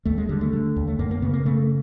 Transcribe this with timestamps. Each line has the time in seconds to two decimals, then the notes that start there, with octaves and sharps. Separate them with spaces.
0.05 D#2 A3
0.18 G#3
0.29 D3 G3
0.41 A3
0.53 D3
0.76 D#2
0.87 A3
0.99 F#2 A#3
1.11 A#3
1.22 C#3 B3
1.33 A#3
1.45 C#3 A3